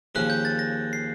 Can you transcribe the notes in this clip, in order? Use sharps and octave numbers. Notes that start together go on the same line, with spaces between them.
D#2 C#3 F3 A#3 C#4 F#6
G6
A6
A#6
C7